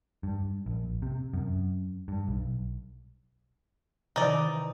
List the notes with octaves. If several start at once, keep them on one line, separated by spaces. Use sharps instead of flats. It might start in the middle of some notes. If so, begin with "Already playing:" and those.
G2
A#1
C3
F#2
G2
B1
C3 D#3 E3 D#4 D5